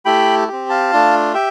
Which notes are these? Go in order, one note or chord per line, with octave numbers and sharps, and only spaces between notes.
A3 E4 G4 G5 B5
C4 G4
F5 A5
A3 D4 F4
G4 E5 G5